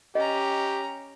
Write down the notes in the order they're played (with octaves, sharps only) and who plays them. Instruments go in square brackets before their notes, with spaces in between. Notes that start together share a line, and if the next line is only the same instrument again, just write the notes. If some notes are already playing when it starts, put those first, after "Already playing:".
[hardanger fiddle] C#4 A#5 [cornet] G4 [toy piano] D#5